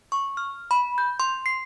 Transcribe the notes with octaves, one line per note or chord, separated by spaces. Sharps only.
C#6
F6
B5
G6
C6
C7